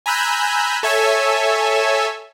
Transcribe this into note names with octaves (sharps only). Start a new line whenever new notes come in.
G#5 A#5 B5 E6 F#6 G6
A4 C#5 E5 G#5 E6